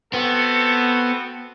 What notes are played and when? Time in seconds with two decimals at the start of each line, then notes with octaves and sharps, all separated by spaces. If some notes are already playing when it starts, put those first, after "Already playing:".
0.14 B3 C4 F#4 A4